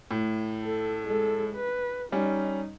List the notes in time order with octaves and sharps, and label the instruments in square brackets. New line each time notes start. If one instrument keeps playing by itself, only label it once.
[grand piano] A2
[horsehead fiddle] A4
G#3 A4
B4
[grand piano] G3 C#4 [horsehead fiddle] D#4